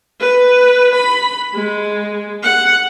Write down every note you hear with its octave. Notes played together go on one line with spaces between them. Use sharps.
B4
B5
G#3
F#5